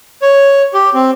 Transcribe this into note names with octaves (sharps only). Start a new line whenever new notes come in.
C#5
G4
C4